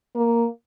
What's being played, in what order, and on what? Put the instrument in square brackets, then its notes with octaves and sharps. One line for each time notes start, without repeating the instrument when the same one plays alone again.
[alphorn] A#3